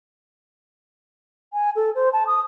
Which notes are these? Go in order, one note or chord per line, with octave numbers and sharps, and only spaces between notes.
G#5
A4
C5
A5
D#6